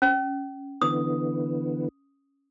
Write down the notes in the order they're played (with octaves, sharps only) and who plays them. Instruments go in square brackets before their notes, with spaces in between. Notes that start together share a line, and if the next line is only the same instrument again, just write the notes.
[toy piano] C#4
[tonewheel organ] D3 E3 B3 [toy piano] D#6